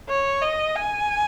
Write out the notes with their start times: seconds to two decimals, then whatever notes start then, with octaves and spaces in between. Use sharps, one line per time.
0.09 C#5
0.42 D#5
0.75 G#5